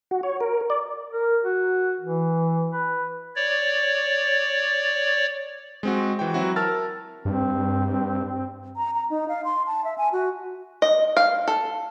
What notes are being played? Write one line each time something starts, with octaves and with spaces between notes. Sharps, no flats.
F#4
C#5
A#4
D5
A#4
F#4
E3
B4
C#5 D5
G#3 C4 F#4
E3 F#4 G5
F#3 C4 E4 F#4
A#4 A5 E6 F6 A6
G2 C4
A#5
A#5
D#4
F5
C6
A5
E5
G#5
F#4
D#5
F5
A4